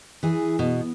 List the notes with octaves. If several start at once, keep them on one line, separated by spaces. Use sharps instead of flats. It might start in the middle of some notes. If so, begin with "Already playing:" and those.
E3 G#4
B2